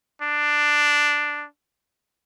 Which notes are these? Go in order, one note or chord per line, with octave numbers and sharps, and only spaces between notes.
D4